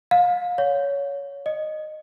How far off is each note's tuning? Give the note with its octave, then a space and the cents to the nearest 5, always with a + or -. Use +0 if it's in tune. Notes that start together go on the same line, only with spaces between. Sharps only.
F5 +30
C#5 +20
D#5 -15